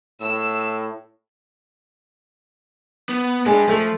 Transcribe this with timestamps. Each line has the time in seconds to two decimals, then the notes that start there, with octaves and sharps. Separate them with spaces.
0.21 A2 E6
3.09 B3
3.46 G#3 D4 G4
3.69 F3 A3